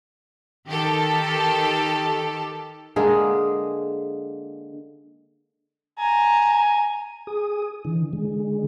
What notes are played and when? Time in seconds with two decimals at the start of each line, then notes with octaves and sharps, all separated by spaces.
0.68 D#3 G4 A4
2.96 D3 G#3 A#3 G#4
5.98 G#5 A#5
7.27 G#4 D#6
7.85 D3 E3
8.13 D3 G#3